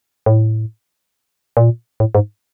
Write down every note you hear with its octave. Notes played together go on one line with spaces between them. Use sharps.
A2
A#2
A2
G#2